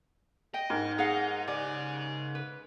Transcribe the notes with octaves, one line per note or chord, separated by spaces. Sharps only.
D#5 G5
G#2 A#4
D#4 G#4 F5 F#5
C#3 G4 D5 G#5
B4